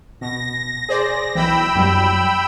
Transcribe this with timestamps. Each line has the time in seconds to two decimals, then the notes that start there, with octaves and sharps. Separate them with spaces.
0.21 B2 A#6
0.89 G#4 C5 D5
1.35 B1 E3 G5 B5 E6
1.75 F#2 F#3 G3